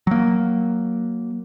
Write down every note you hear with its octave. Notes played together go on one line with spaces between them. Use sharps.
F#3 A#3